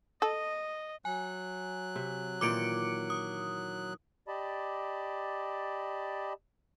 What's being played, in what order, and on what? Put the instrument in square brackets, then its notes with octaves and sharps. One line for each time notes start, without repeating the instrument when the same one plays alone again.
[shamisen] A4 [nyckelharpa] D#5
[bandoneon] F#3 F#6 [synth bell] G#5
[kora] C3 E5
[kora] A#2 D#3 E3 [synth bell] D6 C#7 D7
[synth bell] D#6
[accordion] G4 D5 D#5 A5 B5